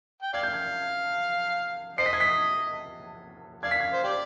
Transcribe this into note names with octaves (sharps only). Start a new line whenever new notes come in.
G5
D5 F5 G#6
G6
G#6
C5 D#5 C7
B6
G#6
B6
D5 F5 G#6
B6
G#6
C5
G4 D5